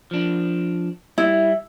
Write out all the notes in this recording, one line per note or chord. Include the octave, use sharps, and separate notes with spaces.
F3 D4
G3 E4